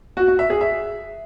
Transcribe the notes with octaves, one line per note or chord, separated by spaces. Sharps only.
F#4
F#4
E5
G#4
E5